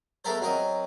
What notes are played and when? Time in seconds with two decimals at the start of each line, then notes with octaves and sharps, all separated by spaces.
0.25 G#3 A3 B3 A4 A#4 C5
0.41 F#3 C4 A#4 D#5